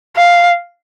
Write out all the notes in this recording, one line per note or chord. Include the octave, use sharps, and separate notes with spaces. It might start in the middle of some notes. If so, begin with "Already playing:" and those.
F5